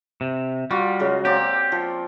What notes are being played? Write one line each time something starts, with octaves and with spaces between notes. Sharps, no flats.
C3
G3 F4 F#4
C#3 F#3 G#3
A#3 C4 G4 D5
F3